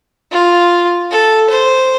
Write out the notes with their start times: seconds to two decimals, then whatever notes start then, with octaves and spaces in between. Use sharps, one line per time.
0.32 F4
1.11 A4
1.50 C5